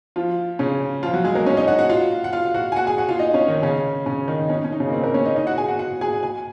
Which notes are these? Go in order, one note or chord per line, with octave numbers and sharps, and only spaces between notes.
F3 F4
C#3 C#4
F3 F4
F#3 F#4
G#3 G#4
A#3 A#4
C#4 C#5
D#4 D#5
F#4 F#5
F#4 F#5
F4 F5
F#5
F4 F5
F#4 F#5
G#5
F#4 F#5
G#4 G#5
F#4 F#5
F4 F5
D#4 D#5
C#4 C#5
D#3 D#4
C#3 C#4
C#3 C#4
D#3 D#4
C#4
D#4
C#4
D#4
C#3 C#4
A#3
C4
A#3 A#4
C#4 C#5
D#4 D#5
D#4 D#5
F#4 F#5
G#4 G#5
F#4 F#5
F#4 F#5
G#4 G#5
G#5